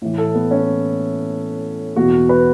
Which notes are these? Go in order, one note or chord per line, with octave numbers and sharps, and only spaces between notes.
A2 E3
A4
B3
C#4
E2 B2 F#4
B4